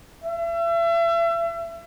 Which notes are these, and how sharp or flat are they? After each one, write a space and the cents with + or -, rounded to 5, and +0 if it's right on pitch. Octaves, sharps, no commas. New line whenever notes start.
E5 +35